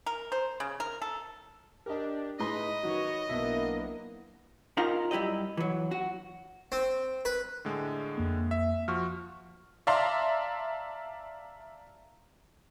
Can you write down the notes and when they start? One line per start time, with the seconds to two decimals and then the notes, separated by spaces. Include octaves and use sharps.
0.06 A#4
0.32 C5
0.60 C#3
0.80 A#4
1.02 A4
1.86 D4 G4 A#4 D#5
2.39 A2 G#3 D#4 B4 D#5 B5 C6
2.83 D#3 F#3 F#4 C#5
3.29 B1 A#3 B3 D4 E4 E5
4.77 C#4 D#4 F4 A#4 D#5 F5
5.11 F#2 G3 E4 G4 D#5
5.57 E3 F#3
5.91 F#4
6.72 C4
7.25 B4
7.65 A2 D3 G#3
8.18 F2 A#3
8.51 E5
8.88 F3 F#4 C#6 F6
9.87 D5 E5 F5 A5 A#5 C6